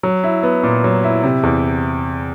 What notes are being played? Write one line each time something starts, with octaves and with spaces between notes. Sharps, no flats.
F#3
E4
B3
A#2
F#3
E4
C3
E2